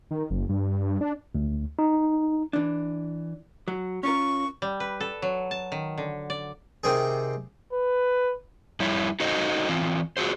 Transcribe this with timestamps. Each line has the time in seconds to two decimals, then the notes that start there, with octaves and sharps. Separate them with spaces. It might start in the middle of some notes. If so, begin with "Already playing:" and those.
0.11 D#3
0.30 F#1
0.49 G2
1.01 D4
1.35 D2
1.79 D#4
2.53 E3 D4
3.68 F#3
4.03 C#4 F4 A#4 C#6
4.62 G3
4.80 B4
5.00 A4
5.22 F#3
5.51 A5
5.72 D#3
5.98 D3
6.30 D5
6.84 C3 D#3 C4 G#4
7.73 B4
8.80 F2 G3 E4 C#5
9.20 D#4 F#4 A4 C5 D#5
9.69 E3 C4 F4
10.17 F4 F#4 G#4 C5